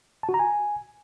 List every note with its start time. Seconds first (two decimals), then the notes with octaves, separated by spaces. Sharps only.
0.23 A5
0.29 F#4
0.34 A#5
0.39 G#5